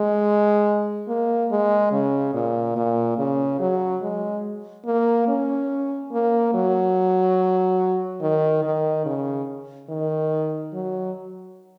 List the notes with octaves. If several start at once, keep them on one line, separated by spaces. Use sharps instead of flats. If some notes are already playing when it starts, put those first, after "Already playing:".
Already playing: G#3
A#3
G#3
C#3
A#2
A#2
C#3
F#3
G#3
A#3
C#4
A#3
F#3
D#3
D#3
C#3
D#3
F#3